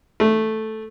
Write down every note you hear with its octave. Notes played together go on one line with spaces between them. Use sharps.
A3